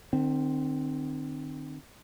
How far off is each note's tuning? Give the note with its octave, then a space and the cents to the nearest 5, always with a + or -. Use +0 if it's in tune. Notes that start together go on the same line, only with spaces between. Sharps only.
D#3 -45 C4 +0